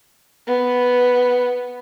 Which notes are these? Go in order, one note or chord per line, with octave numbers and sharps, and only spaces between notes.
B3